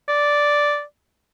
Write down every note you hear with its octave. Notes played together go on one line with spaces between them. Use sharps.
D5